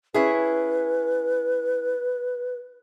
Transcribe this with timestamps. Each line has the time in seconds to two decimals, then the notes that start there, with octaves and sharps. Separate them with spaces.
0.14 C#4 E4 G#4 B4